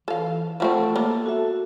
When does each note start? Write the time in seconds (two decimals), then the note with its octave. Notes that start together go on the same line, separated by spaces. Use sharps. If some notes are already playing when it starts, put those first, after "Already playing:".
0.08 E3 A4 F5
0.60 F3 A3 C4 A4 F#5 A5
0.96 A#3 B3
1.26 F#4 A4 E5